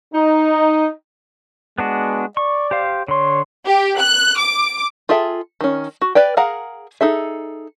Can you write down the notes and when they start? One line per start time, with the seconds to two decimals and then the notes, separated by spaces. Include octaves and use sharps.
0.14 D#4
1.78 G#3 B3 D4 F#4
2.37 D5 C#6
2.71 G4 C5 F5
3.08 D3 C#5 C6
3.66 G4
3.99 F#6
4.38 D6
5.09 F4 G#4 A4 E5 G5
5.61 D#3 C#4
6.02 F#4
6.15 B4 D5 G5
6.37 G#4 A#4 F5 F#5 A#5
7.01 D#4 G#4 A4 E5